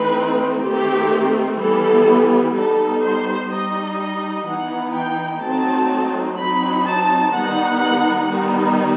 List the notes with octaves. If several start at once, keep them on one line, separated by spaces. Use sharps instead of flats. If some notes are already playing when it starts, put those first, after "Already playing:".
Already playing: E3 A3 C4 D#4 B4
D#3 A3 C4 G4
E3 G3 B3 A4
G3 B3 D#4 A4
C5
G3 D#4 D#5
D#5
E3 B3 D#4 F#5
G5
F#3 A3 C4 D#4 A5
F#3 C4 D#4 B5
A5
D#3 G3 B3 D#4 F#5
D#3 G3 B3 D#4